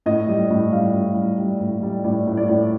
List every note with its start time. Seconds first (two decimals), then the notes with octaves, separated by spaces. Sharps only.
0.06 A2 D#5
0.28 G3
0.50 A2
0.72 G3 F5
0.94 A2
1.16 G3
1.38 G3
1.61 A2
1.83 G3
2.04 A2 D5
2.27 A2
2.37 D5
2.49 A2